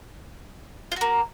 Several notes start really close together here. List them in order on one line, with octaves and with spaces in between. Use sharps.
F4 F#4 A#3